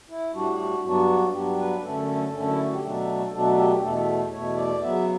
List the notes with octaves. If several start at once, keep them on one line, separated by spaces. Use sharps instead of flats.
E4
A2 G3 D4 F#4
F#4
G2 F#3 B3 D4 F#4
G2 F#3 B3 D4 G4
B4
F#2 D3 A3 C#4 A4
F#2 D3 A3 C#4
E4
F#4
G4
B2 F#3 A3 D4 A4
B2 F#3 A3 D4 A4
G4
E2 B2 A3 A4
E2 B2 A3 C#5
D5
C#3 F#3 B3 E5